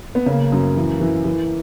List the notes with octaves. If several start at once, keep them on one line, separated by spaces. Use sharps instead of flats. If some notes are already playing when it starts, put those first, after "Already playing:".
B3
C#3 A#3
F#2
E3
E3
E3